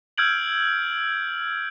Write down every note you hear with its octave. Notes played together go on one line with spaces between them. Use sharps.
E6 F6 G6 G#6 D7 F#7